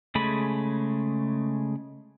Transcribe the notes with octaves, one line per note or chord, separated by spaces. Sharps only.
C#3 G#3 A3 G#4 B5